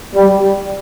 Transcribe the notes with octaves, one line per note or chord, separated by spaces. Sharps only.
G3